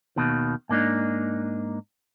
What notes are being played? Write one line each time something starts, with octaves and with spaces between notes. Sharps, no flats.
D#2 B2 D#3
G#2 A#3 D4 D#4